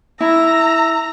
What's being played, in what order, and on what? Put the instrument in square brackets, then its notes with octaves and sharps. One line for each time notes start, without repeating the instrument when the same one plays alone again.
[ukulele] E4 [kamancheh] A#5 [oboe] E6